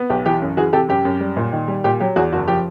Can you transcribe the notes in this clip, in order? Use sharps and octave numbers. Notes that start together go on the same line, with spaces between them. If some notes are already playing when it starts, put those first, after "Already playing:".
Already playing: B3
B1 G4
E3 G4
F#2
E3 F#4 G#4
C3 G4 A4
F#2 G4
F#2
G3
A#2
D#3
G3
A#2 G4
F#3 G4
E2 F#4 G#4
F#1 F#4
F3 G4